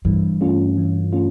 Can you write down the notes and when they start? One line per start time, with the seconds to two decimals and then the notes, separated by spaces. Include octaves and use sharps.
0.05 G2 E3
0.41 A3 C#4 F4
0.78 E3
1.13 A3 C#4 F4